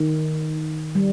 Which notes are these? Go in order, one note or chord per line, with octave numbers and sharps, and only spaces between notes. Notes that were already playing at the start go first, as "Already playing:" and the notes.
Already playing: D#3
G3